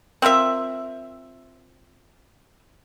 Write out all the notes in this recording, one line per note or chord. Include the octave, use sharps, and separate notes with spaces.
C4 F4 A#4 E5